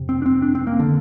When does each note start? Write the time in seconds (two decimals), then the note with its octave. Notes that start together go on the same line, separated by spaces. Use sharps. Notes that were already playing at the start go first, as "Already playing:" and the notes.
Already playing: F2 C3
0.09 C4
0.22 D4
0.26 C4
0.42 D4
0.55 C4
0.67 A#3
0.79 D3